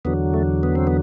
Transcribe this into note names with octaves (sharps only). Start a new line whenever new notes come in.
E2 D3 F#3 B3
A3
B3
C4
B3